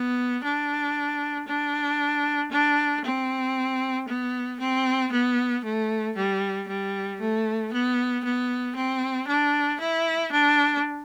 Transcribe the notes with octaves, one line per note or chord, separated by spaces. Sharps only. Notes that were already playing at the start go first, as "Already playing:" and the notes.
Already playing: B3
D4
D4
D4
C4
B3
C4
B3
A3
G3
G3
A3
B3
B3
C4
D4
E4
D4